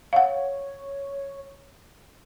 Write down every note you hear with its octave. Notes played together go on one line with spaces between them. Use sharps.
C#5 F5 F#5